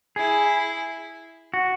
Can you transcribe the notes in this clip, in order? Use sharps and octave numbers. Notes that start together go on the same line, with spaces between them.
E4 G#4
F#4